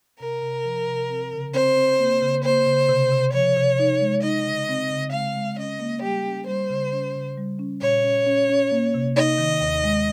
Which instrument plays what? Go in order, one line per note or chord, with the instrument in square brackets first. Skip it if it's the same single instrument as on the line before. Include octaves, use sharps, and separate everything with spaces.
[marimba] C3 [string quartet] A#4
[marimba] C3
F3
C3
C4
C#3
[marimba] C4 [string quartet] C5
[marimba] C4
A#3
C#3
[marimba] A#3 [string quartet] C5
[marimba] C#3
C3
C3
[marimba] F3 [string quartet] C#5
[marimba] C3
D#4
G#3
[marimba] D#4 [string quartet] D#5
[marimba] C#3
C4
C#3
[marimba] G#3 [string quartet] F5
[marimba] G#3
[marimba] C#4 [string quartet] D#5
[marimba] A#3
[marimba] G3 [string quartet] G4
[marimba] C#4
[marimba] G3 [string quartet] C5
[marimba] C#3
C#4
C#3
G3
C#4
[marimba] A#2 [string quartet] C#5
[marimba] C#4
C#4
C#4
A#3
C3
[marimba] D#4 [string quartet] D#5
[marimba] D#3
D#2
G#3